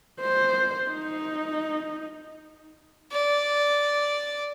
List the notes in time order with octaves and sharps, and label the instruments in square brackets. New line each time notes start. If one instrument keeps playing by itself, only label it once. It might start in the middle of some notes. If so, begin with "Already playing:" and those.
[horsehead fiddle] C5
D#4
[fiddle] D5